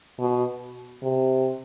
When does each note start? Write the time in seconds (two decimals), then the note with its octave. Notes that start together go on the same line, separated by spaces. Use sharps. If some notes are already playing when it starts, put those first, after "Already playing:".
0.19 B2
1.02 C3